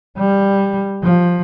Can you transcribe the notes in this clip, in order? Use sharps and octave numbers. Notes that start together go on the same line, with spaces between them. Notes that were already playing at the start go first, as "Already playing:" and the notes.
G3
F3